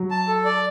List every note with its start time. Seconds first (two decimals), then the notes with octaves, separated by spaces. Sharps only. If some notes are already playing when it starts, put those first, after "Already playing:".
Already playing: F#3
0.11 A5
0.28 A4
0.45 D5